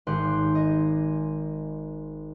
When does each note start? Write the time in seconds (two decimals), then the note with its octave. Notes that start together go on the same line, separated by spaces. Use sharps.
0.07 G#1 G4 C6 F#6
0.55 G#4 D#5